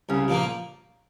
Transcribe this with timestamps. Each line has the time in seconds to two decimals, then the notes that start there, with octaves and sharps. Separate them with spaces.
0.09 C2 C#3
0.28 A#2 F3 A#3